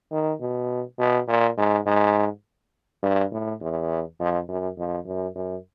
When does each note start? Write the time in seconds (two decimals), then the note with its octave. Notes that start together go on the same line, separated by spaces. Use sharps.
0.12 D#3
0.41 B2
0.99 B2
1.28 A#2
1.57 G#2
1.86 G#2
3.03 G2
3.32 A2
3.61 E2
4.19 F2
4.48 F#2
4.77 F2
5.06 F#2
5.35 F#2